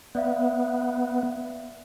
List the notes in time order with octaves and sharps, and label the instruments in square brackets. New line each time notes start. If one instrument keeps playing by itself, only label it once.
[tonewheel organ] B3 [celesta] D5 E5 F5